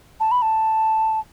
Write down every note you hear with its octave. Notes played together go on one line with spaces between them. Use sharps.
A5
B5
A5